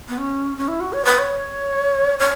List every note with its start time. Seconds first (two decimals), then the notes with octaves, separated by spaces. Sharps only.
0.09 B3
0.18 C#4
0.57 C#4
0.68 E4
0.80 F#4
0.93 C#5
1.05 B4
1.19 C#5
2.19 C#5